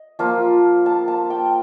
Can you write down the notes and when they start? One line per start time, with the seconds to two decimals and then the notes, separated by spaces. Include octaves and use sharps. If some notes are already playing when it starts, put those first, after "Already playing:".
Already playing: D#5
0.19 F3 A#3 F4 A5
0.86 A5
1.08 A5
1.30 G5